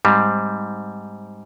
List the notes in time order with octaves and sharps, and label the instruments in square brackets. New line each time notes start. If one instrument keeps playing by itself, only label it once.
[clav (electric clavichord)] G#2 G3 C4